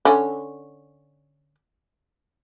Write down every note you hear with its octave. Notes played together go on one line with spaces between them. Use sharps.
D3 C#4